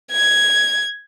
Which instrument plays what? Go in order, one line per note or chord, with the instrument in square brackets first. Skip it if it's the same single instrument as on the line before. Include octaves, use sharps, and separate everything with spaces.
[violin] G#6